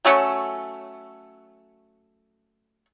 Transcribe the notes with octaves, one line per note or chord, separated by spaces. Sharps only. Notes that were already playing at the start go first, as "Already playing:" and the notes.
F#3 A3 C#4 A4